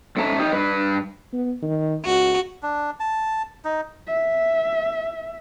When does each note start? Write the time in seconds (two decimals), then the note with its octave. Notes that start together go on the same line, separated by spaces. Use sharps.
0.17 G#2 A3 C#4 E5 A5 A#5
0.38 D#4 G4
0.52 G2 B4
1.33 B3
1.62 D#3
2.06 C#2 F#4
2.63 D4
3.00 A5
3.65 D#4
4.07 E5